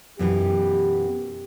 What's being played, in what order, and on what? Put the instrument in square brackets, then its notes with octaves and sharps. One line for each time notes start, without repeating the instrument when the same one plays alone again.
[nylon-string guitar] F#2 B2 E3 [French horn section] G4